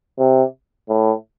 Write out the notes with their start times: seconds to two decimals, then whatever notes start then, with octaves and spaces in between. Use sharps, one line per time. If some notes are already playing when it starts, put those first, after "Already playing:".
0.19 C3
0.89 A2